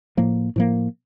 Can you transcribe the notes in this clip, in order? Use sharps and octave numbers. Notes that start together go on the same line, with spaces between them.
A2 F3 A#3
A2 F3 A#3